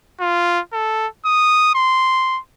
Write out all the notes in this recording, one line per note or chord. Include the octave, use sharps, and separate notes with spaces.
F4
A4
D#6
C6